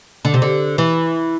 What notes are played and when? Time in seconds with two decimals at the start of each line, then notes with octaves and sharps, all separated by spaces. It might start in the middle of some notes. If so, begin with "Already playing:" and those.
0.25 D3
0.34 C3
0.42 D3
0.78 E3